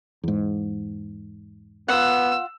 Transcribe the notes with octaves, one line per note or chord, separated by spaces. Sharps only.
E2 G#2
B3 F4 F#5 E6